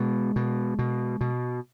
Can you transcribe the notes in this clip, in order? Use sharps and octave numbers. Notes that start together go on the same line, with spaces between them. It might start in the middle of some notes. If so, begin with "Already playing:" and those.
Already playing: B2 G#3
B2
B2
B2